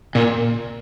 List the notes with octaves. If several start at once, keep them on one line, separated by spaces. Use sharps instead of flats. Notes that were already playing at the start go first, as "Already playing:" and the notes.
A#2